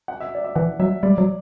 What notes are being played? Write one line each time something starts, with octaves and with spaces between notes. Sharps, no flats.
F#5
E5
D5
E5
E3 F#5
F#3 E5
G3 D5
F#3